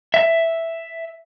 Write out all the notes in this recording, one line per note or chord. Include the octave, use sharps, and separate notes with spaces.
E5